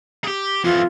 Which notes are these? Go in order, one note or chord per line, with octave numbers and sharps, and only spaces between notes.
G4 G#4
F2 E3 F4